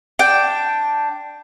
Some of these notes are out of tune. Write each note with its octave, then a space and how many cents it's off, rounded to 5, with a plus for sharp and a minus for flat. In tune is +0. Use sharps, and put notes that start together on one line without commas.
D4 +0 G5 +0